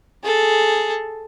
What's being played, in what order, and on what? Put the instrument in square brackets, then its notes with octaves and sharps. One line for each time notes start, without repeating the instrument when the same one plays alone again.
[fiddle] G#4 A4